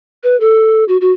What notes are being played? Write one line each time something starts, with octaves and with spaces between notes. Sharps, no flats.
B4
A4
F#4
F#4